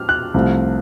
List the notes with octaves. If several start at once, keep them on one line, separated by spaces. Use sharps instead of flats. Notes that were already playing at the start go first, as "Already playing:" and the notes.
Already playing: F6
F#6
C2 C3 F3 A3